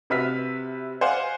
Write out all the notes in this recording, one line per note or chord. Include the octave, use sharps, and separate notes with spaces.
C3 F#4 B4 E5 F6 B6
C5 D5 F5 F#5 G#5